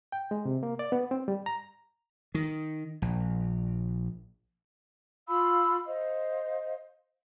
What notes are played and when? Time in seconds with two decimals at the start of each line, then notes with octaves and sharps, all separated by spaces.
0.12 G5
0.31 G#3
0.45 C3
0.63 A#3
0.79 D5
0.92 B3
1.11 C4
1.28 G3
1.46 A#5
2.35 D#3
3.02 A#1
5.29 F4 F5 B5 E6
5.87 C5 D#5 F5